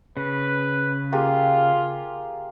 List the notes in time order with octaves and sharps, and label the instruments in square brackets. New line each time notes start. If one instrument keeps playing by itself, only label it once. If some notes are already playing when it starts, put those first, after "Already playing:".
[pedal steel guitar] C#3 [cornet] B4
[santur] A#3 G4 G#4 [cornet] F4